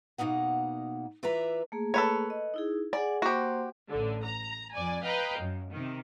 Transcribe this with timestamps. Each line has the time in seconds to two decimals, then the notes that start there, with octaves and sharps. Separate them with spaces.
0.18 B2 D3 A#3 D#4 F#5
1.23 E3 F4 B4 D5 E5 A#5
1.72 A3 A#3 G#4
1.94 A4 B4 C#5
2.30 D#5
2.54 D#4 E4 G#4
2.93 G#4 D5 F#5 G#5
3.22 A#3 F#4 G4 C5 C6
3.89 A1 D3
4.24 A#5
4.73 F2 D5 G#5
5.03 B4 D#5 F5 G5 A#5
5.39 F#2
5.71 C3 D#3